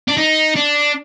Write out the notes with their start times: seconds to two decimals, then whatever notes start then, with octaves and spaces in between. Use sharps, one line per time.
0.08 D4
0.17 D#4
0.56 D4